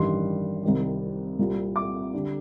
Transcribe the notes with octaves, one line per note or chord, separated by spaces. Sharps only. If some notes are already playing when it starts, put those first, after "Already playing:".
Already playing: A1 G2 D#3 G3 C6
C2 C3 D#3 G3
C2 A#2 G3
D6
D3 G3